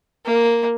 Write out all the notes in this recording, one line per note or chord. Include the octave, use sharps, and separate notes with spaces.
A#3